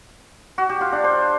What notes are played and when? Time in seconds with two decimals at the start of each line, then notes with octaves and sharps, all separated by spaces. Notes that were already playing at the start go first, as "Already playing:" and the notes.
0.58 F#4
0.69 G4
0.81 F4
0.92 D4
1.04 C5